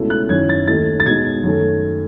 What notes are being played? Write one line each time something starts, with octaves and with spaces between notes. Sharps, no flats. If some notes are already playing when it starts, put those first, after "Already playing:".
Already playing: C#2 B2 A3 C#4 E4
F#6
F#2 D#3 F#3 C#4 E4 G#6
A6
D#2 D#3 A3 D#4 A6
A6
B2 G#3 D#4 G#6
F#2 D#3 A3